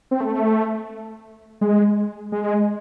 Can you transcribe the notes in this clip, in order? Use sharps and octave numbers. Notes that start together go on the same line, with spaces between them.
C4
A3
G#3
G#3